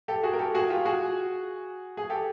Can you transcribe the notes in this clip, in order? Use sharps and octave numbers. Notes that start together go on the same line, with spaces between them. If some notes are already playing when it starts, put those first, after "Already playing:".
G4 A4
F#4 G#4
A#4
G4 A4
F#4 G#4
F4 G4
F#4 G#4
G#4
G4 A4